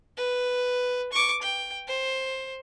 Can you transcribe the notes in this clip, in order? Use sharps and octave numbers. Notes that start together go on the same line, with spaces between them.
B4
C#6 D6
G5
C5